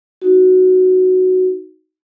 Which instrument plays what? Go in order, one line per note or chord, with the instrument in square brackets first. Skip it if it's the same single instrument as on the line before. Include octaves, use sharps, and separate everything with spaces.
[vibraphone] D#4 F#4